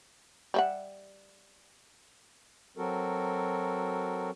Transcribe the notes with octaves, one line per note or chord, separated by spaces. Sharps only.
G3 E5 F#5
F#3 C4 F#4 A4 A#4